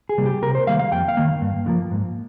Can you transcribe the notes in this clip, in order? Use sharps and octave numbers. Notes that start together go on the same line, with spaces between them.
G#4
C3 G3 A#3
G4
C3 A#4
C5
D#3 G3 A#3 F5
F5
F2 G5
F5
D#3 A#3
G2
D3 F3 A#3
G#2